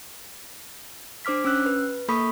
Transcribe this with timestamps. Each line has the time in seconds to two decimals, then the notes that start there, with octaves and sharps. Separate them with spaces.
1.25 D4 C5 D6 F6 B6
1.45 C#4 E6 F#6
1.66 B4
2.08 A#3 A4 B5 C#6 D#6 B6